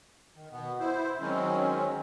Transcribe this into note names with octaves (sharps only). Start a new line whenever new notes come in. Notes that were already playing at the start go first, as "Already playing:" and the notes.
D#3
B2 B3
E4 C5
D#3 F#3 G#3 C4 C#4